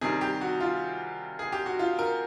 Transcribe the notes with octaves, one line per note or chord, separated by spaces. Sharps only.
C3 D#3 G3 G#4
G4
F#4
F4
G#4
G4
F#4
F4
A#4